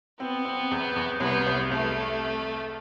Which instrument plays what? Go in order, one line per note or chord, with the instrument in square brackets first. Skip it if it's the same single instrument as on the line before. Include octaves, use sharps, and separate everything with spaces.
[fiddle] B3 [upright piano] C4
[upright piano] C4
E2
E2
[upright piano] C2 [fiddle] B3
[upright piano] C2
[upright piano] C2 [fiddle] A3